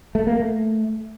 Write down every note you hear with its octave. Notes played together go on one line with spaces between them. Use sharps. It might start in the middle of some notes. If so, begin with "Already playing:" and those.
A3
A#3
A3